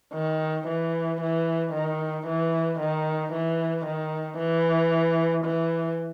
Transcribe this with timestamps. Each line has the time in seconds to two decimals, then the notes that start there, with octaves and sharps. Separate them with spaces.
0.14 D#3
0.68 E3
1.21 E3
1.73 D#3
2.27 E3
2.80 D#3
3.33 E3
3.85 D#3
4.38 E3
5.45 E3